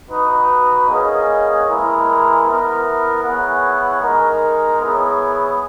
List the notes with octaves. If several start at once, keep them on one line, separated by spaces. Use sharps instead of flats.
D#4 F#4 B4
A#3 C#4 G#4 D#5 F#5
G#3 B3 E4 A#4
B3 E4 A#4
B3 E4 G#4 C#5 F#5
G#3 D#4 A#4
B3 E4 G#4 C#5